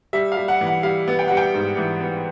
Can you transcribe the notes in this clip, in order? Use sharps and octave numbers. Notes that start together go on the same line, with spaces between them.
G3 E5
F5
G3
F#5
E3
F#5
G3 F5
B3
G5
G3 F#5
G5
G#2
E3
B3